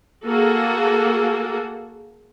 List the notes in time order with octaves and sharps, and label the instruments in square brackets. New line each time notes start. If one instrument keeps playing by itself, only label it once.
[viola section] A#3 F#4 G#4 A4